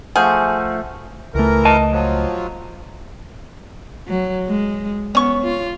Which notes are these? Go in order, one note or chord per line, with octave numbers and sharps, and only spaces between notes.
F3 A3 G#4 F#5 F6 G6
C#2 E3 A3 A#4
D#5 A5
F3 F#3
F#3
G#3
B3 C#4 C#6
F4